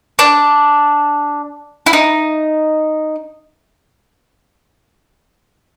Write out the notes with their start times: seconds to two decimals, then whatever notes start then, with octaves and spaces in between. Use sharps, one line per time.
0.19 D4
1.86 E4
1.93 D#4